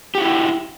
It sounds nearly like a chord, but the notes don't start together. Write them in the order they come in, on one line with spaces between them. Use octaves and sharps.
G4 F#4 E4